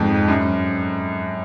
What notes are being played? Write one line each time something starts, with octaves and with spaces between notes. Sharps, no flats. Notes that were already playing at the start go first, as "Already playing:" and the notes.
Already playing: F2 G#2
F#2